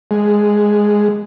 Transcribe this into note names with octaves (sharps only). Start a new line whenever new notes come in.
G#3